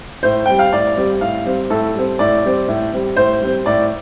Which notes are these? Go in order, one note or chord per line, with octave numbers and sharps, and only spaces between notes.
A2 C5
G3 C4 G5
F5
A2 D5
G3 C4
A2 F5
G3 C4
A2 A4
G3 C4
A2 D5
G3 C4
A2
G3 C4
A2 C5
G3 C4
A2 D5